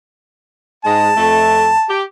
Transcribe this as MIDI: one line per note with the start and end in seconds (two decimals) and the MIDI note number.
0.84 1.10 44
0.84 1.10 56
0.84 1.97 81
1.16 1.71 41
1.16 1.71 57
1.89 2.02 67